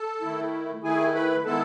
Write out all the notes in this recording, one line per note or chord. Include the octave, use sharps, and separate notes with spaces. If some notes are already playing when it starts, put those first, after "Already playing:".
Already playing: A4 A5
D#3 A3 E4
D#3 A3 E4 G#4 G#5
B4 B5
D#3 G#3 B3 E4 A4 A5